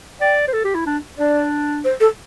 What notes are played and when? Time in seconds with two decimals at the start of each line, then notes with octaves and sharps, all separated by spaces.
0.21 D5 G5
0.48 C5
0.53 A4
0.64 G4
0.75 E4
0.86 D4
1.18 D4 D5
1.84 C5
2.00 A4